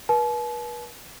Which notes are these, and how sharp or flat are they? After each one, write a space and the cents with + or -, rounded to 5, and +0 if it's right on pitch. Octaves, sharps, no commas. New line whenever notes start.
B4 -40 A5 -40